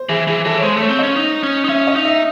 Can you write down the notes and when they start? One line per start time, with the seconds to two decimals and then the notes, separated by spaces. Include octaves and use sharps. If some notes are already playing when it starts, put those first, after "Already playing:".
Already playing: C5
0.09 E3 G#4
0.27 E3 G#4
0.45 E3 A4
0.58 C#5
0.62 G#3 C5
0.77 A3 C#5
0.89 C4
0.99 C#4 D#5
1.16 D#4
1.43 C#4
1.64 D#4
1.69 C#4 E5
1.87 D#5
1.96 D#4
2.05 E5